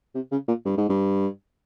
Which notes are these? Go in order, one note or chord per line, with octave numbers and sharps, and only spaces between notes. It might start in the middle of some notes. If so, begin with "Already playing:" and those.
C3
C#3
A#2
G2
G#2
G2